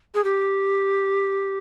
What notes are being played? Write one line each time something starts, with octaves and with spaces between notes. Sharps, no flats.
G#4
G4